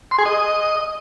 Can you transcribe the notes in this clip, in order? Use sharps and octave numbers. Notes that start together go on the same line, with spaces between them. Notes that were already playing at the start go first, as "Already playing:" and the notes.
C6
G#4
D#5